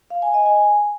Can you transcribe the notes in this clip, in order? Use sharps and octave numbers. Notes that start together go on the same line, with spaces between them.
F5
G#5
D#5
G#5